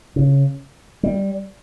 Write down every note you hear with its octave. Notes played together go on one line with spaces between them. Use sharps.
C#3
G3